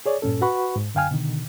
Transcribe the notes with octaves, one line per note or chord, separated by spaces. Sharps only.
G#4 C#5 D5
G2 A#2 C#4 A4
F#4 B4 F#5 B5 C#6
G#2
F#2 D3 F5 G5 G#5 F6
B2 D3 D#3